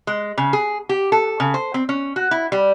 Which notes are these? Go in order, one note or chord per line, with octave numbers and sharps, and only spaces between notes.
G#3
C#3
G#4
G4
A4
C#3
C5
C4
C#4
F#4
E4
G3